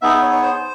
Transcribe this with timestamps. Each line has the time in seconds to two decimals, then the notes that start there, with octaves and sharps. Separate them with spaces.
0.02 B3 D#4 G#4 E5
0.22 C#5
0.32 C#5
0.42 C5